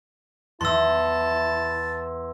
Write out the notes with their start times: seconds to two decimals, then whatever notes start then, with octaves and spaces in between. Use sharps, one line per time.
0.61 E2 E4 A5 C6 E6